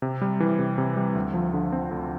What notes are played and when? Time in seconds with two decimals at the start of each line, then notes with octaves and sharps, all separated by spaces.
0.02 C3
0.21 G3
0.40 E3
0.59 C3
0.78 C3
0.97 G3
1.15 D2
1.34 F3
1.54 D3
1.72 C4
1.91 D2